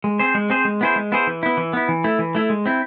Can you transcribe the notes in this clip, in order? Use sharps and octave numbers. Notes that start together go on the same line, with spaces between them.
G#3
C4 G#4 C5
G#3
C4 G#4 C5
G#3
B3 E4 G#4 C5
G#3
B3 E4 G#4 C5
E3
B3 E4
E3
B3 E4
E3
A3 E4
E3
A3 E4
G#3
C4 E4